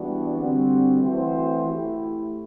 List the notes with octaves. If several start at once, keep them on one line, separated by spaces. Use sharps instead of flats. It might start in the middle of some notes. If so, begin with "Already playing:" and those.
Already playing: E3 G3 B3 D4 F#4
D3 G3 C4 F#4
E3 A3 C4 F#4 C5
A3 E4 G4